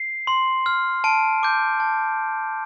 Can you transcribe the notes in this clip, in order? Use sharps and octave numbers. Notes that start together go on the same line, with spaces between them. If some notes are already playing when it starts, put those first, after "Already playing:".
Already playing: C7
C6
F6
A5 D7
D6 G6
A5